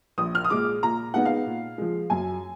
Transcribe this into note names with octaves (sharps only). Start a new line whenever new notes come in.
A#1 D#6
F6
D#6
A#2 G#3 D6
A#2 A#5
G#3 B3 D#4 F#5
F5
A#2
F3 G#3
F#2 G#5